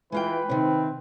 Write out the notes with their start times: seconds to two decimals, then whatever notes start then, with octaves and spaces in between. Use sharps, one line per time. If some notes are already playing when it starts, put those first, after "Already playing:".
0.12 E3 G#3 F4 B4 G5
0.49 C3 D#3 C4